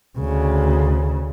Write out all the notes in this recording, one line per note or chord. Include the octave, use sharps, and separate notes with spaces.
D2 C#3